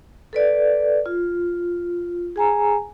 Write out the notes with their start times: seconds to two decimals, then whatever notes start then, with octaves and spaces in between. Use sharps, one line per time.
0.33 A4 B4 D5
1.06 F4
2.36 G#4 G#5 A#5